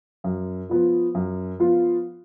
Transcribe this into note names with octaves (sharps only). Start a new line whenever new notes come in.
F#2
F3 B3 F4
F#2
F3 B3 F4